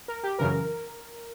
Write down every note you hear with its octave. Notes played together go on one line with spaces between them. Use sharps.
A#4
G4
F#2 C#3 E3 A#4